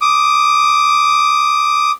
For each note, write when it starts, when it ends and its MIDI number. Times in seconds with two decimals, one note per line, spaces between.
0.01 1.91 86
0.01 1.91 87